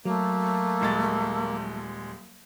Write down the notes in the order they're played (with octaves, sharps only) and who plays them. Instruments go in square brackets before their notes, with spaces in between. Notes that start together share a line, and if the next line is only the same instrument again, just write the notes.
[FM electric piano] F#3 [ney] A3 [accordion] A#3
[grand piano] D#1 G#3 A6